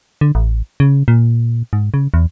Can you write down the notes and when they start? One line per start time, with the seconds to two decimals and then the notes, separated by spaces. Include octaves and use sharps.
0.21 D3
0.35 A1
0.80 C#3
1.08 A#2
1.73 G#2
1.94 C#3
2.14 E2